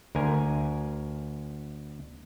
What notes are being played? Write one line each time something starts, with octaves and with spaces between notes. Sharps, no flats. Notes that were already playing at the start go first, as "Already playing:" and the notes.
D2 A#4 G#5